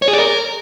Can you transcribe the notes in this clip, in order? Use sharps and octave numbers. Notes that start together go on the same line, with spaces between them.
C#5
G#4
D5
A#4